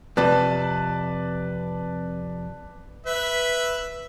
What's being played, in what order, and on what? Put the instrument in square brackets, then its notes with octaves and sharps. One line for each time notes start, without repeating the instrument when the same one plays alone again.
[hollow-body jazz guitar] F2 C3 [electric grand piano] B4 D5 A5
[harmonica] B4 E5